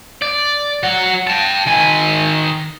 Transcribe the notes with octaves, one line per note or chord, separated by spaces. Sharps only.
D5
F#3 F#5
G5 A5
D#3 G#5